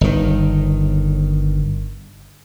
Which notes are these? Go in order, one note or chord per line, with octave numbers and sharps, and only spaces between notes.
G1 D#3